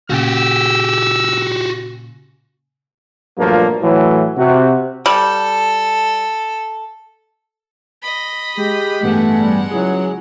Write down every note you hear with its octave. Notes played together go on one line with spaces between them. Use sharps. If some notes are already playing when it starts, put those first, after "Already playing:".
A#2 C#3 F#4 G4 E6
G2 A#2 F3 F#3 A3 A#3
A2 E3 F#3
C3 F#4
G3 A4
D#5 B5
G#3 G4
A1 G2 G#3 A3 B3 F#5
G3
C#2 F#3 E4 G#4